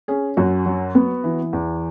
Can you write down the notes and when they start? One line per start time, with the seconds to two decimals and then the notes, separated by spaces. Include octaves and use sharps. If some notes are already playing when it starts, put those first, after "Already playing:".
0.08 C#4 G#4
0.37 F#2 F#4
0.66 F#3
0.95 B3
1.24 E3
1.53 E2